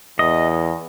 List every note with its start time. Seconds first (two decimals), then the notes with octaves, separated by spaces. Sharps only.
0.19 E2 D#5